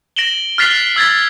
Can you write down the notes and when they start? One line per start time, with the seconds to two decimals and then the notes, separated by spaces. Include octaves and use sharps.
0.16 A#6 D7 E7 F#7 G7
0.58 F6 F#6 A6 B6 C7 F7
0.96 E6 G#6 A6 B6